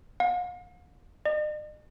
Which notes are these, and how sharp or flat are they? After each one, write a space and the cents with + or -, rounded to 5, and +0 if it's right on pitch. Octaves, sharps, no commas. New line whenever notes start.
F5 +45
D#5 -45